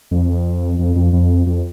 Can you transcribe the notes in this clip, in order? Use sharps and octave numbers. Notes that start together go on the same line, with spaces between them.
F2
F2
F2
F2
F2